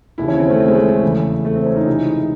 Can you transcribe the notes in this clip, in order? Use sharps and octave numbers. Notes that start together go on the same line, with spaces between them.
D#2 C#3 E3 E4
C#4
C4
A3
C4
G#3
A3
A3
E2 C#3 E3
A3
C4
C#4
D#4
C#2 C3 E3